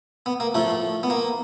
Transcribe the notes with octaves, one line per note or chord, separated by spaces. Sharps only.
B3
A#3
A2 F3 A3
B3
A#3